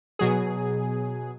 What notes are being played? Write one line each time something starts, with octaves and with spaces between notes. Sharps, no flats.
B2 F#3 G#4